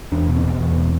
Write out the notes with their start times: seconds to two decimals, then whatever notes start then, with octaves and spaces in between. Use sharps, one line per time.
0.12 E2 D4
0.28 B2
0.36 C4
0.44 B2
0.60 E2
0.76 B2